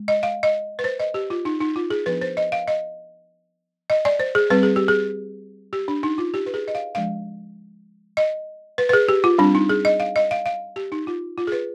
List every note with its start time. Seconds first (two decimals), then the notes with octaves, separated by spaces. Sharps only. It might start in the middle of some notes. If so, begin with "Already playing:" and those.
Already playing: G#3
0.08 D#5
0.23 F5
0.43 D#5
0.79 B4
0.84 C5
1.00 D#5
1.14 G4
1.30 F4
1.45 D#4
1.60 D#4
1.76 F4
1.90 G#4
2.06 F3 B3 D4 B4
2.21 C5
2.37 D#5
2.52 F5
2.68 D#5
3.90 D#5
4.05 D5
4.20 C5
4.35 G#4
4.50 G3 C4 B4
4.63 G#4
4.76 G4
4.88 G#4
5.73 G4
5.88 D4
6.03 D#4
6.18 F4
6.34 G4
6.46 B4
6.54 G#4
6.68 D#5
6.75 F5
6.95 F3 G#3 D4 F5
8.17 D#5
8.78 B4
8.89 B4
8.93 G#4
9.09 G4
9.24 F4
9.38 G3 C4 D4
9.55 D#4
9.69 G#4
9.85 D#5
10.00 F5
10.16 D#5
10.31 F5
10.46 F5
10.76 G4
10.92 D#4
11.07 F4
11.38 F4
11.47 G#4
11.52 B4